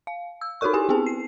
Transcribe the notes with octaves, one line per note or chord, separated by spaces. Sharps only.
F5
E6
D#4 F#4 A4 A#4 C#6
E4 G4 G#5
B3 C4 E4 G#4 A5
C7